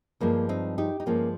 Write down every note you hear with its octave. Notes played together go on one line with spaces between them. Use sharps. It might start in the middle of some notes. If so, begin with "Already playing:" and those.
G2 F3 G#3 A#3
C4 D#4
D#4 G4
D#4
G2 F3 G#3 A#3 C#4